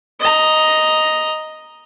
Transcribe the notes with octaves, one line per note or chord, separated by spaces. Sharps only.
D#5 A#5